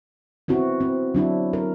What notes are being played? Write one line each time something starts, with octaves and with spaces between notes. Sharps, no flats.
B3 C4 E4 F#4
C4
F#3 D4 E4
A#4